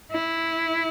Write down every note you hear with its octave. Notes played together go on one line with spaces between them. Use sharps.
E4